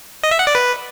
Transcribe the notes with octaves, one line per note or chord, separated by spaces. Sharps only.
D#5
E5
F#5
D5
B4